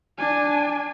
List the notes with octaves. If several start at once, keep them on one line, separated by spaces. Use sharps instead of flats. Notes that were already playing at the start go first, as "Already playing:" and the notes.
D4 G#5